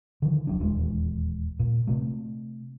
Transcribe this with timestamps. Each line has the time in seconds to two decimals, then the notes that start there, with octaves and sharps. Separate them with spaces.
0.22 D3 D#3 F3
0.47 E1 F#3 D4
0.60 D#1 E2 G#3
1.59 A#2
1.87 C3 A3